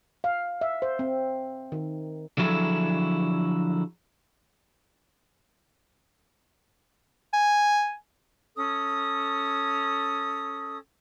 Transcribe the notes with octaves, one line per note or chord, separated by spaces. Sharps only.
F5
E5
C5
C4
D#3
D3 F3 F#3 E4 G#4 A4
G#5
C#4 A4 D#6